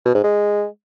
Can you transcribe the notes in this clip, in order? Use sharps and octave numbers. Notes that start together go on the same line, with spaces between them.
B2
G#2
G#3